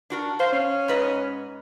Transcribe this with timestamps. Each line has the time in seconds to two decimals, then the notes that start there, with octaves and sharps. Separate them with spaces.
0.10 D4 F#4 A#4
0.40 C5 F5
0.52 C#4
0.88 G#2 B4 D#5